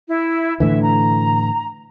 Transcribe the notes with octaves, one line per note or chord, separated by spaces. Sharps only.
E4
A2 D3 E3 E5
A#5